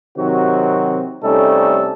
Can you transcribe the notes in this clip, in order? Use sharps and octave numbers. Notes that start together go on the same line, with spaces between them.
C3 D#3 F#3 C4 F#4
C3 G3 A3 C#4 D#4 A4